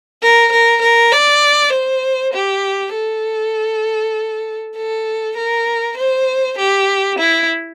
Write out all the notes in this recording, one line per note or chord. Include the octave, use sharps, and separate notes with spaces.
A#4
A#4
A#4
D5
C5
G4
A4
A4
A#4
C5
G4
E4